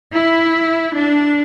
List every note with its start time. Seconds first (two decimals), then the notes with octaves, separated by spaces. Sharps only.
0.13 E4
0.94 D4